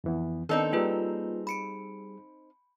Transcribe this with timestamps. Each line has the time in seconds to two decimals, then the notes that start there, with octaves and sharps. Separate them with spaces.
0.04 F2 E3 B3
0.49 D#3 B3 C4 D4 D#4 A4
0.73 G3 A#3 F4 G#4 B4
1.47 B5 C#7 D7